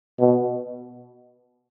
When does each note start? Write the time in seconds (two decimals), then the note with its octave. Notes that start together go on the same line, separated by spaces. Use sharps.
0.20 B2